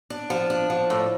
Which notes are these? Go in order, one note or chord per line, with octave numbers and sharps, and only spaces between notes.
D4
F3
D4
F3
A2